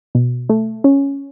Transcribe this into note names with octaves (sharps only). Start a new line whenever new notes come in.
B2
A3
C#4